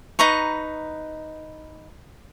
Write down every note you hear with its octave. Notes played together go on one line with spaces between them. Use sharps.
D#4 B4 A#5 C#6